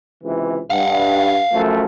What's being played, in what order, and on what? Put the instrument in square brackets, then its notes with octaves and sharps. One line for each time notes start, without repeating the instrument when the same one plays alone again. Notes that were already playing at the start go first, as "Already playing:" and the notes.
[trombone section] C#2 C3 E3
[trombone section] G2 [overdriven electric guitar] F5 F#5
[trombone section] F#2 F3 A3